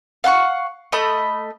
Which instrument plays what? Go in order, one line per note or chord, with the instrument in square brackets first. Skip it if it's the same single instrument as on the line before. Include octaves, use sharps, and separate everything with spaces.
[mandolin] F5 F#5 C6 C#6
A3 D#5 B5